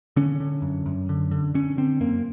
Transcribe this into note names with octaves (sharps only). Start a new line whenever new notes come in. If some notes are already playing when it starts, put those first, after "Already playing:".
D3 C#4
D3
F#2
F#2
D3
D3
D3 C#4
D3 C4
F#2 A#3